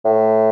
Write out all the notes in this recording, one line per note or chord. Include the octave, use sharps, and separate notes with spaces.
A2